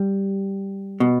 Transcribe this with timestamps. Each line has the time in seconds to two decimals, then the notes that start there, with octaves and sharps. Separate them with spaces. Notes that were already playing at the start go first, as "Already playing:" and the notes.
Already playing: G3
1.00 B2